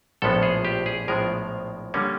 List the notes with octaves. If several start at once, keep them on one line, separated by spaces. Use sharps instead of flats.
A#1 A2 F3 G#3 B3 A4
G#4
G4
G#4
A#1 A2 F3 G#3 B3 A#4
D3 G3 A#3 C#4